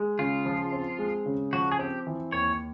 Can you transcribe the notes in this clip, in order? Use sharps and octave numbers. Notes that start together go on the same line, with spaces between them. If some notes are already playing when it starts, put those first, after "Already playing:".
Already playing: G#3
C#3 F4
F3
C4
G#3
C#3
F3 F#4
G#4
C4 G4
E3
D#2 C#5